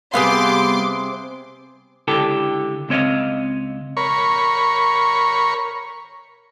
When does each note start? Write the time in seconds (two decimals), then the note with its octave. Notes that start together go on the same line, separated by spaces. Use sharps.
0.14 C3 G3 B3 G#4 F5 C6 D6
2.08 C#2 D3 E4 G4 A4 A5
2.89 C#2 C4 C#5 D#5 F5
3.97 A#4 C#5 B5 C#6